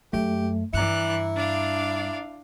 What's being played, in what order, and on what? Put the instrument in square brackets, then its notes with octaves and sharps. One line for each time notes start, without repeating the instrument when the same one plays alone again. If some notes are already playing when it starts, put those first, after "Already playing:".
[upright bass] F#2 [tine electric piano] A3 [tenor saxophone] G4
[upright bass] G2 [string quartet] E3 D5 F#6 [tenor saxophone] E4 [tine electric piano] A#5 C#7
[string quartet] D4 D5 F5